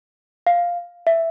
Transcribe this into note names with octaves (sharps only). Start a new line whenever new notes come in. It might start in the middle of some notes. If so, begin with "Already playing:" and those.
F5
E5